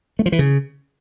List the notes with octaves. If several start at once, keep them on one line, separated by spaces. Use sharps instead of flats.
A3
F3
E3
C#3